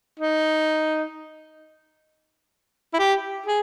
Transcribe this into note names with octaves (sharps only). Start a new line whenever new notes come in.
D#4
E4
G4
G#4